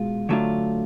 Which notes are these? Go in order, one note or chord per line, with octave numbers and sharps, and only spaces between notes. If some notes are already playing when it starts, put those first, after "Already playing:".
Already playing: B2 G#3 F4
D3 F#3 A3 D4 F4